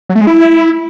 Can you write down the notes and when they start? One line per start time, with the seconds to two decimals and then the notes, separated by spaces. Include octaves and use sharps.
0.09 F#3
0.15 A3
0.21 G#3
0.27 E4